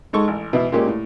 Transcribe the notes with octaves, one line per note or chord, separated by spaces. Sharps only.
G#2 G#3 A4 C#6
A1
B2 E3 E4
A#2 G#3 A#3 C#4 G4
A2